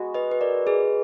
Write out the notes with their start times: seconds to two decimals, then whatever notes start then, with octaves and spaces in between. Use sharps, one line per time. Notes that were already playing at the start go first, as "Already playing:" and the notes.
Already playing: G#3 B3 F#4
0.14 B4 D#5
0.31 B4
0.41 A#4 D5
0.67 G#4 B4